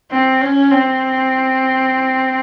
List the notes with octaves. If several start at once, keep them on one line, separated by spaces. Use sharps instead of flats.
C4
C#4
C4